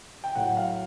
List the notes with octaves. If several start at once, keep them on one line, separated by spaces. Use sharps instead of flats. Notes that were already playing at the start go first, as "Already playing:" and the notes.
G5
A2 F#3 F#5
F5